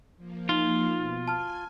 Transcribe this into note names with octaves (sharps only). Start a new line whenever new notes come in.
F3 A#3
D#4 F4
B2
G#5 A5 F6